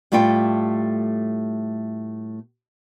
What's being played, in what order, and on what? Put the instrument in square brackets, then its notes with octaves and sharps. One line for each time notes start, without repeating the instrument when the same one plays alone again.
[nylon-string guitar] A2 G3 A3 F4 A4 G5